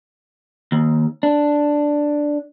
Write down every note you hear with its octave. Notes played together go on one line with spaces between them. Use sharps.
D#2
D4